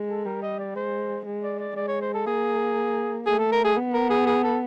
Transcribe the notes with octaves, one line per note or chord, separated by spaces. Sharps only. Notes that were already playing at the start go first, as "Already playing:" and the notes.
Already playing: G#3
A4
G3 A#4
D#5
D5
G#3 C5
G#3
D5
D5
G#3 D5
C#5
C5
A4
A#3 G#4
A3 G#4
A4
A#4
G#4
B3
A#4
G#4
G#4
A4